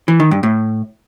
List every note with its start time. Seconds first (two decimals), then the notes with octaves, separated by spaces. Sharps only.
0.08 E3
0.20 D#3
0.31 G2
0.43 A2